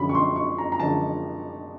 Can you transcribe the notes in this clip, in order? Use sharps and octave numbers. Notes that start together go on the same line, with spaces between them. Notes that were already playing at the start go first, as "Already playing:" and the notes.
Already playing: F#2 D3 F3 G#3 B5
C#6
C6
C#6
A#5
A#5
F#2 D3 F3 G#3 A5